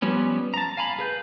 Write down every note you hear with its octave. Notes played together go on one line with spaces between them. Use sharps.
F3 G3 B3 C#4
A5 A#5
F5 G#5 A#5 B5
G#4 B4 G6